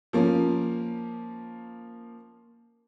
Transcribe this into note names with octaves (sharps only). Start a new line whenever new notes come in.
F3 A#3 C#4